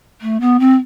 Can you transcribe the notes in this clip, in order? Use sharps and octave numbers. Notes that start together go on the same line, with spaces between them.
A3
B3
C4